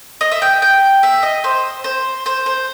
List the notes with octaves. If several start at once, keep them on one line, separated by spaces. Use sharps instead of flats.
D#5
E5
G5
G5
E5
D#5
C5
C5
C5
C5